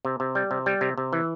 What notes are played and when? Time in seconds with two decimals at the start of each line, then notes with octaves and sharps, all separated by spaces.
0.05 C3
0.20 C3
0.35 G3
0.51 C3
0.66 G3
0.81 C3
0.98 C3
1.13 E3